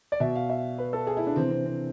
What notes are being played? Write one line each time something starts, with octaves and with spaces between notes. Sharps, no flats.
D5
B2 E5
F5
E5
B4
A4
G#4
E4
D4
C3 E3 C4
C4
C4